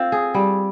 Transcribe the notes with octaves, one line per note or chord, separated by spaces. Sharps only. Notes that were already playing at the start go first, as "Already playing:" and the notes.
Already playing: C4 F4
G#4
G3